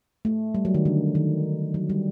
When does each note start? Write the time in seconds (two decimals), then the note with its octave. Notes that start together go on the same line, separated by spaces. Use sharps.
0.25 A3
0.54 G3
0.65 F#3
0.74 D#3
0.85 D3
1.15 D#3
1.74 F#3
1.89 G3